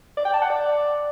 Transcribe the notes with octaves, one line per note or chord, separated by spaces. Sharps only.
D5
G5
A5
F#5
D5